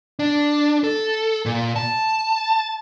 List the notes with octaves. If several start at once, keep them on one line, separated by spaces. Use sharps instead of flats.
D4
A4
A#2
A5